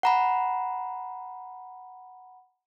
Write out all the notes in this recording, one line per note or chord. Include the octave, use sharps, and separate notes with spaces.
F#5 A#5 B5